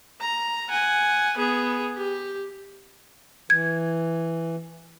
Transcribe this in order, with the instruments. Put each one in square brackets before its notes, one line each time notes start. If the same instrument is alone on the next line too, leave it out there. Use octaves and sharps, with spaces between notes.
[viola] A#5
F#5 G#5
B3 G#4
G4
[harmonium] E3 [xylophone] G#6